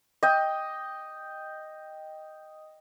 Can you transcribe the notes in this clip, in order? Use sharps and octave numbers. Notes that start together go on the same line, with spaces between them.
D#5 G5